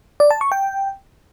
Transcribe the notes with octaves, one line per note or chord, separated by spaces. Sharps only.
D5
A5
C#6
G5